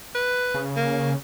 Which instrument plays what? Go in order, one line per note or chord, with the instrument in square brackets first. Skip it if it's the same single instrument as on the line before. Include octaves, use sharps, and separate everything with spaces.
[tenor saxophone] B4
[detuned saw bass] C#3
[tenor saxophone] A#3